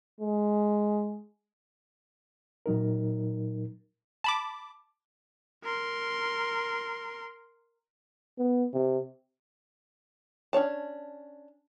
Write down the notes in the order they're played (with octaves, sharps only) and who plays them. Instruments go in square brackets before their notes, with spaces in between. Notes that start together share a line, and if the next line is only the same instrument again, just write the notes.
[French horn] G#3
[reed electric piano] A#2 F#3 D#4 A#4
[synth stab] A5 B5 D6
[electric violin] A#4 C6
[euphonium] B3
C3
[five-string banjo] C#4 D4 C#5 A5